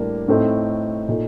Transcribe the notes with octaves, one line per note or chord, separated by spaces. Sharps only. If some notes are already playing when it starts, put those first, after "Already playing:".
Already playing: A2 G3 A#3 D4
A2 A3 C4 D#4
A#2 A3 D#4